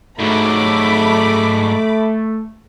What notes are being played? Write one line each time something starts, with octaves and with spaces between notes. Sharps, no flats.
G#2 F#3 A3 B5 D6